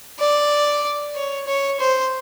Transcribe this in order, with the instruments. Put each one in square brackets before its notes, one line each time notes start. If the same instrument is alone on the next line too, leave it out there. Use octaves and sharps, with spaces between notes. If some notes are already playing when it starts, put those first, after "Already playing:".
[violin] D5
C#5
C#5
C5